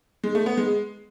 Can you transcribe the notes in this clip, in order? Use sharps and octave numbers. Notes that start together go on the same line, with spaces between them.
G#3
A3
B3
G#3